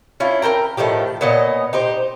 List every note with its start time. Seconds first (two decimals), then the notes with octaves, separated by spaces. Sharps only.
0.20 C#4 E4 F4
0.42 A#4 C5 G5 A#5
0.77 A2 D#3 F3 G4
1.21 A#2 B3 C#4 D#5
1.73 D#4 G4 C5